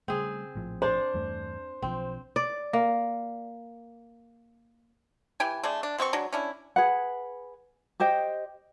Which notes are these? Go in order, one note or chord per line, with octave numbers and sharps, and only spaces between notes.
C#3 G3 A3 C4 G#4
A#1 A2 F3
D4 C5 D5
E2 G2 A3
B1 D#3 F3 C4
D5
A#3
E3 G4 G5 G#5
D3 A3 G#4 D5
D4
B2 C4 D#4 C#6
F#3 G#3 D4
C#4 D4 E4
G#4 B4 F#5
G4 C5 D#5 G5